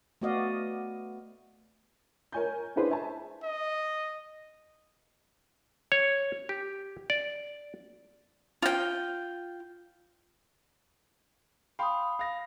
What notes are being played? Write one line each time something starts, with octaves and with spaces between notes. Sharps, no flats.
A3 B3 F#4 D5 D#5 F5
A#4 C#5 G#5 G6
C#4 D4 E4 G#4 B4 C5
E5 G#5 A5
D#5
C#5
G4
D5
F4 G5
F5 G5 B5 C6 D#6
F5 A#6